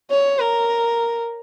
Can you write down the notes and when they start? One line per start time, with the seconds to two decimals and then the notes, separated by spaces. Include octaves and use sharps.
0.11 C#5
0.39 A#4